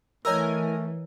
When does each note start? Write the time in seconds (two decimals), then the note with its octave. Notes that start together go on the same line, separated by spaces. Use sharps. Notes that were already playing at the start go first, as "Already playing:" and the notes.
0.25 E3 A3 A#4 C#5 D#5 G#5 A#5 E6